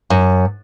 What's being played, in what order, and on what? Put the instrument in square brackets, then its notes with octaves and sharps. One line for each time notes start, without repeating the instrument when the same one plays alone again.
[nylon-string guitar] F#2